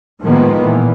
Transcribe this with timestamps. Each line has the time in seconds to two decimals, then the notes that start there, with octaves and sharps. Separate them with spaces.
0.22 A2 D#3 F3 G#3 A#3 B3
0.61 A#2 E3